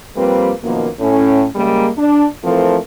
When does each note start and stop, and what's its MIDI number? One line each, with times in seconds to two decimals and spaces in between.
0.16 0.52 53
0.16 0.52 55
0.16 0.52 58
0.16 0.52 60
0.16 0.52 71
0.63 0.89 42
0.63 0.89 47
0.63 0.89 51
0.63 0.89 53
0.63 0.89 58
1.00 1.45 45
1.00 1.45 61
1.56 1.88 49
1.56 1.88 55
1.56 1.88 56
1.56 1.88 58
1.98 2.27 62
2.44 2.78 52
2.44 2.78 53
2.44 2.78 57
2.44 2.78 60
2.44 2.78 69
2.44 2.78 70